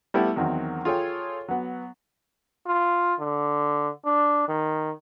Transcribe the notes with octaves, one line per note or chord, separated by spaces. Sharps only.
G3 A3 B3 E4 G4
E2 D#3 F#3 C4
F4 G#4 A4 C#5 G5
F#3 B3
F4
D3
D4
D#3